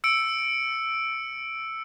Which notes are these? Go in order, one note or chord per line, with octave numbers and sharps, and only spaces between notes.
E6 C#7 D7